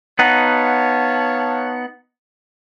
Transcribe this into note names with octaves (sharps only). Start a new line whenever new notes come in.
B3 D#4 C#5 F5 F#5 A5